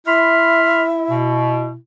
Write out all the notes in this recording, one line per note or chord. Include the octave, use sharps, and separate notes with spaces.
E4 E5 B5 C6 F6
B2